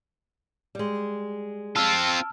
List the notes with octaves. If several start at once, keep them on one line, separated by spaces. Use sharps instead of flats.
G3 G#3
C4 F4 A5 E6 F6